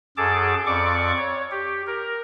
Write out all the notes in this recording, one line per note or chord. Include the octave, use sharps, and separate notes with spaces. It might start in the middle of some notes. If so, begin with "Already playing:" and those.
F#2 G#4 A4 A5 D6
F2 D5 C#6 D6
C#5
G4
A#4